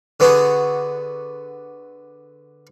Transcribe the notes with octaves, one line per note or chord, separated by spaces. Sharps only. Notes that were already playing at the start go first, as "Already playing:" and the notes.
D3 B3 F#4 G#4